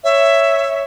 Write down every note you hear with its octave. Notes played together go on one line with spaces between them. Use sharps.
C#5 E5